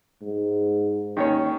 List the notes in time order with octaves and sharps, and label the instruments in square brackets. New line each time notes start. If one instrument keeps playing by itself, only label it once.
[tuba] G#2
[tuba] D#2 [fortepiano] D#3 C#4 C#5